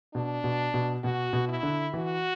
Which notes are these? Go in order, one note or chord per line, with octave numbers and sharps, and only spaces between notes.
B2 D4
B2
B2
B2 F#4
B2
E4
D3
E3 F#4